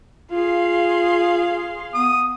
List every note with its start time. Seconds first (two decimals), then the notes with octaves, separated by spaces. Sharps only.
0.32 F4 G#4 F5 C6
1.94 B3 D#6